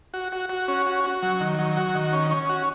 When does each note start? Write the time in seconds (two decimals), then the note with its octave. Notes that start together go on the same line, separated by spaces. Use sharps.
0.14 F#4
0.32 F#4
0.49 F#4
0.68 C#4
0.86 F#4
1.04 F#4
1.22 F#3
1.40 D#3
1.59 F#3
1.77 F#4
1.95 D#3
2.13 C#4
2.31 C#4
2.49 F#4